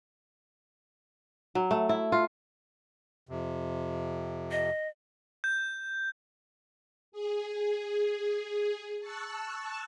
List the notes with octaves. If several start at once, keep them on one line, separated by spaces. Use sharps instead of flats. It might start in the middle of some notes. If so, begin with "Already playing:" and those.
F#3
A3
E4
F4
F2 C3
D#5
G6
G#4
A5 C#6 E6 F#6